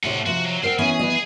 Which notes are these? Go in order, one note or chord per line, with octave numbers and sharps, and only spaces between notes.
A2 C3 A3 C#5 F#5
C3 F3 F#4
F#3
C4 A#4 C5 F#5
E3 B3 C#4 G#4 G#5
E3 B3 D#5